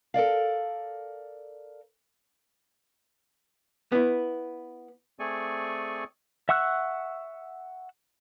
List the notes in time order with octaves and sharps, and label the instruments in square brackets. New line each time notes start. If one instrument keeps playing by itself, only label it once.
[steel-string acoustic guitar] A4 A#4 D5 F5
[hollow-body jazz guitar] B3 E4
[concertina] A3 C4 G#4 D5 G#5 C#6
[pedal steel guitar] E5 F#5 C#6 E6 F#6